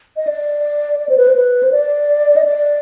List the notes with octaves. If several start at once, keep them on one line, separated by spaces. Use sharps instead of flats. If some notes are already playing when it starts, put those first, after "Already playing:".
D#5
D5
D5
C5
B4
C5
B4
C5
D5
D#5
D5